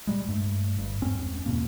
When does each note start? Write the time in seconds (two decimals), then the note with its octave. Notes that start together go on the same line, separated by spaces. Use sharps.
0.07 A#2 G3 G#3
0.28 G2 A3
0.78 G1 G2
1.02 E2 G#2 C4 C#4
1.46 E2 B2 A#3